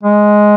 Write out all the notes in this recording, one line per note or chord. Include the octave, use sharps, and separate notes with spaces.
G#3